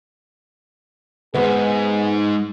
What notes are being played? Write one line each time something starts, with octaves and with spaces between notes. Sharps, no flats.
D2 G#2 B3 G#4